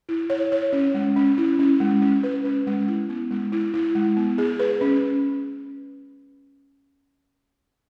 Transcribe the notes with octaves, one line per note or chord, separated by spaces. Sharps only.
E4
C#5
C#5
C#4
G#3
C#4
E4
C#4
G#3
C#4
B4
C#4
G#3
E4
B3
G#3
E4
E4
G#3
B3
G#4
B4
C#4